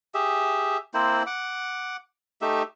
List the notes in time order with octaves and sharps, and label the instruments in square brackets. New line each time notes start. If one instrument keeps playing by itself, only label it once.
[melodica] G4 G#4 E5
A#3 C4 E4 C5
F#5 D6
A3 D#4 G4 E5